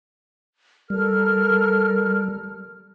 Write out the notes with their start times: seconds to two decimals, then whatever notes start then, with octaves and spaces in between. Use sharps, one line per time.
0.90 G3 A4 A#4 F6